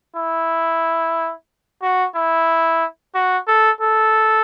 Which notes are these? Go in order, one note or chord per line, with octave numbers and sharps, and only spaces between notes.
E4
F#4
E4
F#4
A4
A4